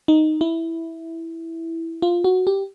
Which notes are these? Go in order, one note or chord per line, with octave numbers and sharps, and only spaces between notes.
D#4
E4
F4
F#4
G4